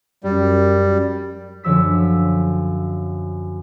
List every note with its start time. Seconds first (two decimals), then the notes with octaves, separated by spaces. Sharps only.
0.24 F#2 G3
1.63 F#2 D3 F3 E6 B6